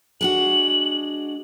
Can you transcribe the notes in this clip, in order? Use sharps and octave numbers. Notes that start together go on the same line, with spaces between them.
G#3 D4 F#4 F#7